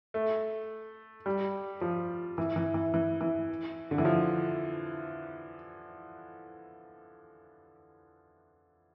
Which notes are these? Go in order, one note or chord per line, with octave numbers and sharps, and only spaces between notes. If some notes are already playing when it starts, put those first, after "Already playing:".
A3
G3
F3
E3
E3
E3
E3
E3
D3
E3
F3